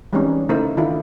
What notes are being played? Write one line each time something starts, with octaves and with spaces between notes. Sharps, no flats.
E3 G3 G#3 C4 C#4 D#4
C#3 A3 D#4 E4 A#4 C5
D#3 D4 E4 F4